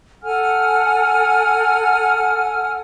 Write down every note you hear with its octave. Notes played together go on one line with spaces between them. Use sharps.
A4 F#5 G#5 F6